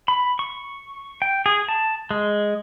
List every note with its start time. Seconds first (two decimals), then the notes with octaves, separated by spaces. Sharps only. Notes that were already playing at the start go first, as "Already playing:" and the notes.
0.08 B5
0.39 C#6
1.22 G5
1.46 G#4
1.68 A5
2.11 G#3